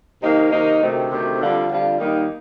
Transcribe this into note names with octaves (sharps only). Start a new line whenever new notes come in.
C3 D#3 A#3 D#4
C3 D#3 A#3 D#4
D2 C3 D#3 A3 C4
D2 C3 D#3 A3 C4
F2 D3 G3 D4 F4
F2 D3 G3 D4 F4
D#2 D#3 G3 A#3 D#4